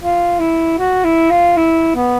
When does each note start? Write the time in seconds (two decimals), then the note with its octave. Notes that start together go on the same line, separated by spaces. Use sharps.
0.01 F4
0.39 E4
0.79 F#4
1.04 E4
1.30 F4
1.57 E4
1.95 B3